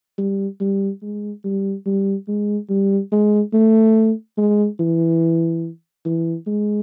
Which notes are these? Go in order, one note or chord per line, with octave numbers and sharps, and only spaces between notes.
G3
G3
G#3
G3
G3
G#3
G3
G#3
A3
G#3
E3
E3
G#3